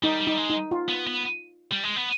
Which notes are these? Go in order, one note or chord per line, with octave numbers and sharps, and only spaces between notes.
G3 D#4
G3
D#4
G#3
D#4
F4
B3
B3
G3
G#3
B3